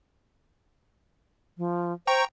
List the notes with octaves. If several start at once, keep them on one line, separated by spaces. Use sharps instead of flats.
F3
C5 G5 A#5 C#6